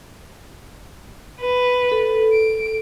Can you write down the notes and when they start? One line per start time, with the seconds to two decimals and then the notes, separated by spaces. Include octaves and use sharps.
1.40 B4
1.92 A4
2.33 D7